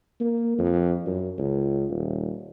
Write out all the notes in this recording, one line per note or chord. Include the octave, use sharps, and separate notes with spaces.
A#3
F2
F#2
C#2
D#1